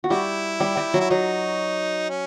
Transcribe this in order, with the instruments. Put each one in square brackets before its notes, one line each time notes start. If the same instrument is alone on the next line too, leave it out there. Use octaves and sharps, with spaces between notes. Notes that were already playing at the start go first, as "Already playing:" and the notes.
[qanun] F#4
[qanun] G3 G4 [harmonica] E4
[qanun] G3 G4
G3 G4
F#3 F#4
[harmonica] E4
[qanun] F#3 F#4 [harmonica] D#4
[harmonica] C#4